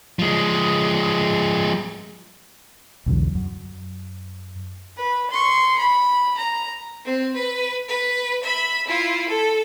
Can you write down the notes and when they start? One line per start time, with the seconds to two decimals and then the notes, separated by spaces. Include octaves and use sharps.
0.19 F3 G#3
3.06 B1 E2 D3 F#3
3.35 F#2
4.97 B4
5.30 C6 C#6
5.78 B5
6.38 A#5
7.05 C4
7.36 B4
7.88 B4
8.43 E5 B5
8.87 E4 F4
9.28 A4